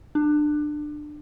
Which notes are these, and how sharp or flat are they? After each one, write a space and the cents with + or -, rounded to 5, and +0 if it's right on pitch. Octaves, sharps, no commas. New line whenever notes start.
D4 +25